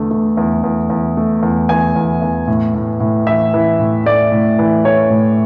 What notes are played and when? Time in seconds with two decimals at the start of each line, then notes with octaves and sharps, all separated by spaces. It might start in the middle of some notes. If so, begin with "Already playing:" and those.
Already playing: E2 D3 A3
0.11 A3
0.37 E2
0.64 E2
0.90 E2
1.17 A3
1.43 E2
1.69 E2 G#5
1.96 E2
2.22 E2
2.47 A2
2.74 A2
3.00 A2
3.26 E3 E5
3.54 E3
3.80 A2
4.06 A3 D5
4.32 A2
4.59 E3
4.85 A3 C#5
5.10 A2